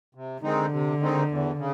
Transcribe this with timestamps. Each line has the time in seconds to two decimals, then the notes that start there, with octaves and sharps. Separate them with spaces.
0.15 C3
0.43 D3 D#3 G#3 C4 D#4
0.71 C3
1.00 D#3 G#3 C4 D#4
1.29 E2
1.58 C#3